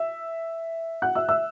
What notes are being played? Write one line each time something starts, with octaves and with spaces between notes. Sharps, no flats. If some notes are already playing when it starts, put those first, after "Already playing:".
Already playing: E5 E6
F#5 F#6
E5 E6
E5 E6